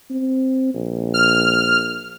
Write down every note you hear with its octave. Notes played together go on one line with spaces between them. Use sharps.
C4
A#1
F6